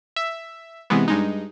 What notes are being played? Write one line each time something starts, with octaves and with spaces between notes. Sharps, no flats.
E5
C3 E3 G#3 B3
G2 G#3 D#4